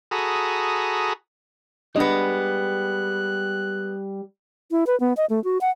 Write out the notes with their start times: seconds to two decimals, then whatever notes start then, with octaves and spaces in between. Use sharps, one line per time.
0.11 F#4 G#4 A4 A#5 B5 D#6
1.96 G3 G#3 B3 D4 D#5 F#6
4.71 E4
4.87 B4
5.00 B3
5.17 D#5
5.30 A3
5.44 F#4
5.61 F#5